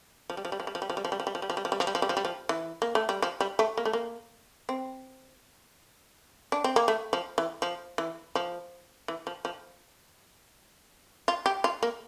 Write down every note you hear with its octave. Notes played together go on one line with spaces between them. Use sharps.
F3
G3
F3
G3
F3
G3
F3
G3
F3
G3
F3
G3
F3
G3
F3
G3
F3
G3
F3
G3
F3
G3
F3
G3
F3
G3
F3
E3
A#3
A3
G3
F3
G3
A3
A#3
A3
A#3
C4
D4
C4
A#3
A3
F3
E3
F3
E3
F3
E3
F3
F3
F4
G4
F4
A#3